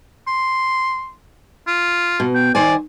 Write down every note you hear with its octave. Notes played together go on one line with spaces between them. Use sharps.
C6
F4
B2
G5
D#3 C5 D5 G#5